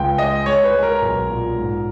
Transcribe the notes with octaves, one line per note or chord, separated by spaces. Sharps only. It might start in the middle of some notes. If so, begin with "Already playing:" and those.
Already playing: C#2 G5
G#3 D#5
G#3 C#5
B4
G#3
A#4
B1
A#2
G#2